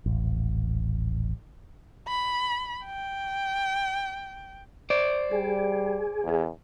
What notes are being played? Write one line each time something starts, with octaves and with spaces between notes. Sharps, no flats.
D#1 A1
B5
G5
C5 D5
G3 G#4
E2